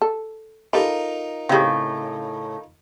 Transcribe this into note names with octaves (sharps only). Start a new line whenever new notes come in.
A4
D#4 F4 G4 A4 A#4 B5
A2 C#3 C4 G4 G#4